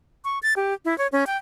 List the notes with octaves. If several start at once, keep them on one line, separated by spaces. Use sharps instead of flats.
C#6
A6
G4
E4
C#5
C#4
G5